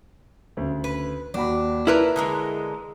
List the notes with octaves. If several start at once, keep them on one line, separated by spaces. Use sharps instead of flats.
D2 C#3
B4
D#2 D4 F#4 B5
E4 A#4 B4 A5 F#6
D3 E3 G#3 A#5 D#6